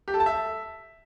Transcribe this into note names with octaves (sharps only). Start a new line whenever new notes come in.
G4
A4
A5
E5